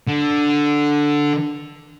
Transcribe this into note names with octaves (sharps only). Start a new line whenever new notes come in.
D3